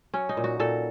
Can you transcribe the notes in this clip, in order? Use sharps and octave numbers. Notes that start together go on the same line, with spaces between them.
F#3 C#4
D#4
A#2
F#4
A#2 A4